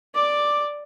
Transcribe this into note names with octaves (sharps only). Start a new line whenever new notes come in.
D5 D6